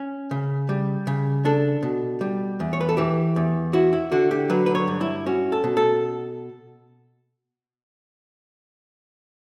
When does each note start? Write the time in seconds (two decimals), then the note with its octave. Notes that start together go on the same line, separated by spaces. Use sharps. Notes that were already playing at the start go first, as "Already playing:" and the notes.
Already playing: C#4
0.31 C#3
0.69 G3
1.07 C#3
1.45 D4 A4
1.83 B2
2.21 G3
2.60 E2
2.73 C#5
2.81 B4
2.89 A4
2.97 E3 G4
3.36 E2
3.73 E4 F#4
3.93 E4
4.12 D3 F#4
4.31 G4
4.50 F#3 B4
4.66 B4
4.75 C#5
4.87 G2
5.01 E4
5.26 C#4 F#4
5.52 A4
5.64 B2
5.77 A4